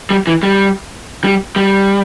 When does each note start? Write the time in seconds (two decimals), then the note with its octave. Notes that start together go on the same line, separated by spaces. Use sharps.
0.10 G3
0.27 E3
0.43 G3
1.24 G3
1.56 G3